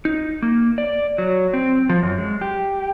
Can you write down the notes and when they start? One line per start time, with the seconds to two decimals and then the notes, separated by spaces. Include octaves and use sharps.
0.05 D#4
0.42 A#3
0.78 D5
1.18 F#3
1.53 C4
1.90 F3
2.03 F#2
2.18 G#3
2.41 G4